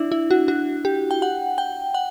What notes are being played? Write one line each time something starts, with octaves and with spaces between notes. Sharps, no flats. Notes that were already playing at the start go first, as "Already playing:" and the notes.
Already playing: D4 E4
E4
F#4
F#4
G4
G5
F#5
G5
F#5